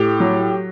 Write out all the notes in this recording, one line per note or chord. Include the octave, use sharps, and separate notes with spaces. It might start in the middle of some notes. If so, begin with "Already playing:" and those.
Already playing: A2 G4
F#3